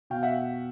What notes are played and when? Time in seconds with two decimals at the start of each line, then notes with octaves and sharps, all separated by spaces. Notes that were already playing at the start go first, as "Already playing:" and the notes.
0.10 B2 F5 G5
0.23 E5 F#5